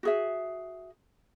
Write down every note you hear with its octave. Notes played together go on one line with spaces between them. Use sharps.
F#4 G#4 E5